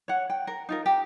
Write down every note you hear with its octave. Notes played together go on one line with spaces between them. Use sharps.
C#5 F#5
G5
A#4
D#4 F4 A#4
G4